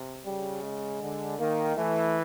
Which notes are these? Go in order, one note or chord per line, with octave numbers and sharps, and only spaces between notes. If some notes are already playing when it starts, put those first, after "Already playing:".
Already playing: C3
C#3 G3
G#3
D3
D#3 A#3
E3 A3